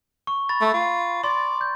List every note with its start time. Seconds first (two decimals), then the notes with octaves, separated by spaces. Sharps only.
0.27 C#6
0.49 B5 A6
0.61 A3
0.74 F4
1.24 D5 C6
1.61 G6